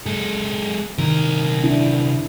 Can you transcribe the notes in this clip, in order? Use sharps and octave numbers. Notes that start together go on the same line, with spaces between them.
G#3 A4
C3 D#3 A#4
D4 E4